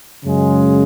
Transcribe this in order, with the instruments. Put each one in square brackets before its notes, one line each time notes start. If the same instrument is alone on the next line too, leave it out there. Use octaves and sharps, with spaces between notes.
[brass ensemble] F#2 C#3 G#3